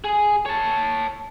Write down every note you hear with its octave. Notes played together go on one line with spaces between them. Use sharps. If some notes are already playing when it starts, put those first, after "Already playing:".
G#4
C#5 A5